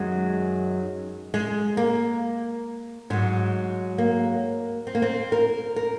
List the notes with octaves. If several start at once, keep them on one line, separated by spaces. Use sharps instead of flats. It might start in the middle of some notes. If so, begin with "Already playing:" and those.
Already playing: F#2 D#3 F#3 G#3
G#3
A#3
G#2 F#3 G#3
A#3
C4
A#3
C4
A#4
A#4